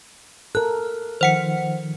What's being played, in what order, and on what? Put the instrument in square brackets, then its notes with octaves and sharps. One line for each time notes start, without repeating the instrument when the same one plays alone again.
[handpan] A4 A#4 [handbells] F#6
[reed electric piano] D#3 F3 [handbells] C5 F#5 C#7